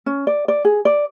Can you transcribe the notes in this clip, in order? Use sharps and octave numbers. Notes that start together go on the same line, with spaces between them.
C#4
D5
D5
G#4
D5